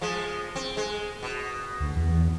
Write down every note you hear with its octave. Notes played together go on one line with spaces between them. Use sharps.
F3 G#3
C4
G#3
B2
D2
E2